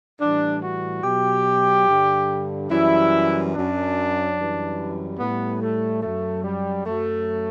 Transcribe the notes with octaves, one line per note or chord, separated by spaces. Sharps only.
A2 E3 G3 D4
F#4
B2 F#3 G4
G2 D3 G3
F#2 E3 G3 E4
F#2 F#3 D4
F#2 E3 G3
A2 G3 B3
A3
F#2 F#3 A3
G3
F#2 F#3 A3